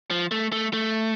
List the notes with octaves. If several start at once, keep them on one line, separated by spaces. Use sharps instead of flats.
F3
A3
A3
A3